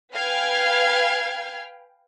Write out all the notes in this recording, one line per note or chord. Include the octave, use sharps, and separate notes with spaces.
B4 F5 G5 G#5 F6 G#6